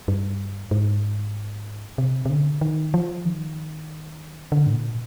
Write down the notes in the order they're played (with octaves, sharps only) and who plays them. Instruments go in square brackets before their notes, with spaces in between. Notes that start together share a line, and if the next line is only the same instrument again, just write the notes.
[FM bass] G2
G#2
C3
C3
D3
D#3
F3
D#3
D3
G#2
A#2